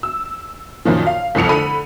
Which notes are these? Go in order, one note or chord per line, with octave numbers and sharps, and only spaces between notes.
E6
F#2 A#2 D#3 F3
F5
F1 C2 F2 C#7 F7
D3 B5 D#7